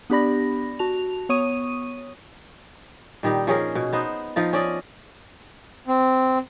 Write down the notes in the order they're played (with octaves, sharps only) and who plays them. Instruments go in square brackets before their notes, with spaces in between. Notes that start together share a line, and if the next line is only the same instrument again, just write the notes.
[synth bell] B3 D4 G4 D5 B5 A#6
F#4 A5 F7
B3 C#5 C#6 D#6 D#7
[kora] A#2 D#3 G3 D#4
F3 C#4 G#4 A#4
B2
B3 D#4 C5
F3 D#4 F4
C#4 D5 D#5
[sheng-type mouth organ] C4